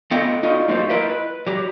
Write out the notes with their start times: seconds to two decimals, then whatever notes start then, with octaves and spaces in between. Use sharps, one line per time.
0.11 A3 B3 F4 A4 D#5 G5
0.43 D#4 F4 F#4 D#5
0.68 F#3 A3 A#3 F4 G4 C5
0.89 E4 F4 A#4 B4 D#5 E5
1.10 B4
1.47 F#3 G4